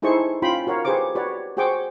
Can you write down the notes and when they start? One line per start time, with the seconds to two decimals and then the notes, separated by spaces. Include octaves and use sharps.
0.02 D#4 E4 G#4 A4 C5 C#6
0.42 C#4 F4 G5 B5 C6
0.67 F#4 A#4 C#5 F5
0.85 G4 G#4 B4 C5 C#6 D6
1.15 F#4 G4 B4 C#5 D5
1.57 F#4 G#4 C5 G5 C#6 D6